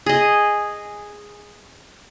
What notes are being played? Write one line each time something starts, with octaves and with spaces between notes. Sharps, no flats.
G#4 D#5